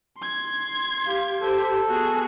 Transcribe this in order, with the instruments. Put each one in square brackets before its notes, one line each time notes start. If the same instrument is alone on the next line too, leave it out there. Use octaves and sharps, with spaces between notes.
[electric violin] C6 G#6
[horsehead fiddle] G4 F5
[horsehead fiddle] G4 C5 [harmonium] A4
[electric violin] B3 G#4 [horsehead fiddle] F#4